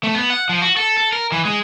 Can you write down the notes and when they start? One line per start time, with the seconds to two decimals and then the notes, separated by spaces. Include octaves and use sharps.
0.03 A3
0.15 B3
0.30 F#5
0.49 F3
0.62 F#4
0.77 A4
0.97 A4
1.13 A#4
1.32 E3
1.45 G#3